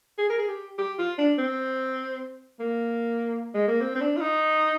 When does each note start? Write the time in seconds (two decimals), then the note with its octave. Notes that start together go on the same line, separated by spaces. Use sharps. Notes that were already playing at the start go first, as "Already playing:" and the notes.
0.18 G#4
0.29 A#4
0.38 G#4
0.48 G4
0.78 G4
0.98 F4
1.18 D4
1.38 C4
2.60 A#3
3.54 G#3
3.68 A#3
3.81 C4
3.95 C4
4.01 D4
4.17 F4
4.21 D#4